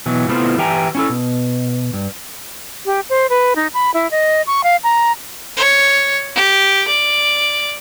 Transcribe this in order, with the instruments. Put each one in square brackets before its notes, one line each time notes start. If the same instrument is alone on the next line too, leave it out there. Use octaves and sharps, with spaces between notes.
[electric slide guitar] B2 E3 F#3
C3 A3 B3 E4 F4 C5
E3 G4 E5 G5 G#5 A#5
C#4 E4 A4
B2
G2
[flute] G4
C5
B4
D#4
B5
E4
D#5
C#6
F5
A#5
[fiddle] C#5
G4
D5